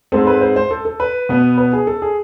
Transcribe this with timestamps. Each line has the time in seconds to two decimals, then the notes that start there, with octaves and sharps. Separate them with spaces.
0.12 G#2 G#3 C4 A4
0.27 B4
0.41 C5
0.56 C5
0.71 A4
0.85 A4
1.00 B4
1.29 B2 B3
1.58 B4
1.73 G#4
1.87 A4
2.02 G#4